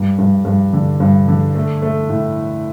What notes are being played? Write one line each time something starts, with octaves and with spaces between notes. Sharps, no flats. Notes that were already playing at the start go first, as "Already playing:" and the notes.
Already playing: G2
G2
G2
D3
G2
D3
A3
A3
A2